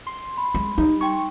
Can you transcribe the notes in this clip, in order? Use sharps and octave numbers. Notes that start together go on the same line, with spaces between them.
C6
B5
G#3
G3 D#4
D#4 G5 C6 C#6